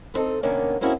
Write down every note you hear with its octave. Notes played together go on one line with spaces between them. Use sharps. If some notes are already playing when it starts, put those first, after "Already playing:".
B3 C4 D#4 A4 D#5
C3 D#3 A#3 B3 C#4 D4
A#3 C4 C#4 E4 F#4 G#4